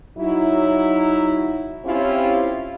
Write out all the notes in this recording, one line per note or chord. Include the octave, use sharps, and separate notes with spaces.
F#3 D#4 E4
C4 C#4 E4 F4 G4 C#5